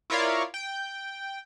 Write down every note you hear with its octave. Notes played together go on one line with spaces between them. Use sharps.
E4 F4 A#4 C#5 D5 F5
G5